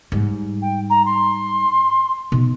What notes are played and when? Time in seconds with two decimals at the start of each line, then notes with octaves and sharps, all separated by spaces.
0.12 G#2 G3
0.62 G5
0.90 A#5
1.05 C6
2.32 B2 D#4